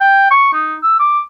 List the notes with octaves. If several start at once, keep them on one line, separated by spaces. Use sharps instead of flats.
G5
C#6
D#4
E6
D6